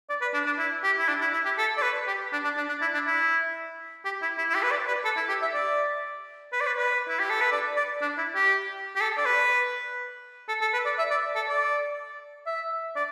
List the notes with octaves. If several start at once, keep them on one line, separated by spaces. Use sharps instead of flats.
D5
B4
D4
D4
E4
G4
E4
D4
E4
E4
G4
A4
D5
B4
G4
D4
D4
D4
D4
E4
D4
E4
G4
E4
E4
E4
G4
B4
D5
B4
A4
E4
G4
E5
D5
B4
D5
B4
B4
E4
G4
A4
B4
D5
D5
D4
E4
G4
G4
A4
D5
B4
A4
A4
B4
D5
E5
D5
A4
D5
E5
D5